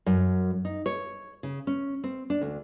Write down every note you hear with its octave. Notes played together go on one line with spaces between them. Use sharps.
F#2
D#4
C#5
C#3
C#4
C4
D4
D2